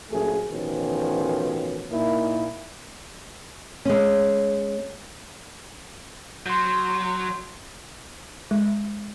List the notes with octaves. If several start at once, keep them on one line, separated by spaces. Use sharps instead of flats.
A#1 F#2 A3 G#4
A1 B2 D#3 F3 C#4
A#2 A#3 D#4 E4
G#3 C#4
F#3 C6 G6
G#3